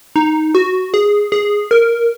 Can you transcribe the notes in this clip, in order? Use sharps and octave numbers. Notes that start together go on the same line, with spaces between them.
D#4
F#4
G#4
G#4
A#4